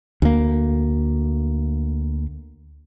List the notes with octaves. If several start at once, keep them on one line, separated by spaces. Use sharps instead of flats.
D2 A#3